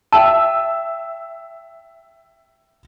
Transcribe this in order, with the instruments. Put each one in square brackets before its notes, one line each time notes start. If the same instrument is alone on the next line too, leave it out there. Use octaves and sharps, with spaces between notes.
[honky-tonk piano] E5 E6 [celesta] G5 A5